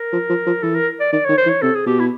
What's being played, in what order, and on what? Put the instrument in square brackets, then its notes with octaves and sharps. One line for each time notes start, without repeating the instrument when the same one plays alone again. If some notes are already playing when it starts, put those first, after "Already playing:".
Already playing: [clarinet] A#4
[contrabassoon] F3
F3
F3
[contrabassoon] E3 [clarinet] A4
[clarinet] A#4
D5
[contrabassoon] D#3 [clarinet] D5
[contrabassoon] D#3 [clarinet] C#5
[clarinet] C5
[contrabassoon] E3
[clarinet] C#5
[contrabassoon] C3 [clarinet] A4
[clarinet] G#4
[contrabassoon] B2 [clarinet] G4
[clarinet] E4